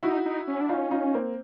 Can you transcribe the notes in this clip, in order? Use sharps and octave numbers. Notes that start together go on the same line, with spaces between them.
D#4 E4 F#4
D#4
C#4
D4
C#4 D#4 F4
D#4 F4
A#3 C4